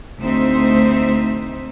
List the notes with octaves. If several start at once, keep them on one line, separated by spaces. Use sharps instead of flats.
D2 A3 C4 D#4 C5 E5